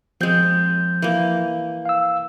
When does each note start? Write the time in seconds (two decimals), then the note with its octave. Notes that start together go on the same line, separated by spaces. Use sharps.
0.21 F3 G#3 C4 G6
1.02 E3 A#3
1.85 F5 E6